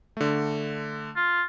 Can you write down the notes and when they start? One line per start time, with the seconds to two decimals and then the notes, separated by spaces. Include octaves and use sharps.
0.17 D3 A3
1.16 F4